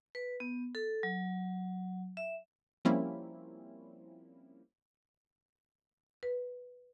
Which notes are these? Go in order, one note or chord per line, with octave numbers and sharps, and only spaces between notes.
B4
B3
A4
F#3
E5
F3 G3 A#3 C4 C#4 E4
B4